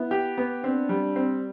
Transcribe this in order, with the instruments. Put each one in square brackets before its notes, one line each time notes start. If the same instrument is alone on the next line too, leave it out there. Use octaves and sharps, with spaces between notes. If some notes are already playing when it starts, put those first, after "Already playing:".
Already playing: [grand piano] B3 [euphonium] E4
[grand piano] G4
B3
[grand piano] C4 [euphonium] D4
[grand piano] G3
C4